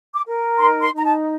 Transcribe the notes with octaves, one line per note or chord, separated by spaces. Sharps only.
D6
A#4
D#4 C6
C6
D#4 A#5
A5